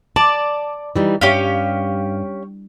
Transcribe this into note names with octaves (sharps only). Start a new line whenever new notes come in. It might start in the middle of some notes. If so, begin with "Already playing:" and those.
D5 A5
E3 G3 D#4
G2 C#4 G4 F5